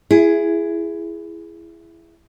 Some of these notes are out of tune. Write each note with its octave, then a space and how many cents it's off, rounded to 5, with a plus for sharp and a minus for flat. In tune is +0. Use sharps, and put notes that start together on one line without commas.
E4 +20 G#4 +0